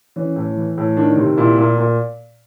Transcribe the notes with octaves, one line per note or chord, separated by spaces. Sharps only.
E3 C#4
A2
E3
A2
D#3 D4
C3
A#2 E4
A#2
A#2